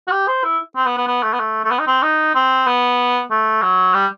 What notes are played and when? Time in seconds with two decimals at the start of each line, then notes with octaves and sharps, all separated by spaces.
0.07 F#4
0.11 G4
0.27 C5
0.44 E4
0.76 C4
0.86 B3
0.97 B3
1.07 B3
1.23 A3
1.33 B3
1.39 A3
1.64 A3
1.71 B3
1.79 D#4
1.87 C4
2.02 D#4
2.35 C4
2.66 B3
3.31 A3
3.62 F#3
3.94 G3